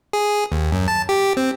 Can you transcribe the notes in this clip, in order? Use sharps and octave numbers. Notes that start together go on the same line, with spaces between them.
G#4
D#2
F#2
A5
G4
C4